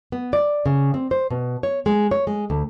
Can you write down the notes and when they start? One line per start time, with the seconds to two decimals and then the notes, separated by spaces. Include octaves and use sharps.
0.12 B3
0.33 D5
0.66 C#3
0.94 C4
1.11 C5
1.30 B2
1.63 C#5
1.86 G#3
2.11 C#5
2.27 G#3
2.50 D2